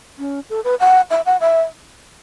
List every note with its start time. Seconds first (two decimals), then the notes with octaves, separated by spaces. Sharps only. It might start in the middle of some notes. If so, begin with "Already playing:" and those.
0.19 C#4
0.50 A4
0.64 B4
0.80 F#5
1.11 E5
1.26 F#5
1.41 E5